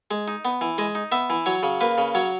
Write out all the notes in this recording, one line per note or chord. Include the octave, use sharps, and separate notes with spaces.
G#3
D#4
B3
E3
G#3 D#5
D#4
B3 E5
E3
F#3 C#5
C#3
A#3 B4
C#3
F#3 C#5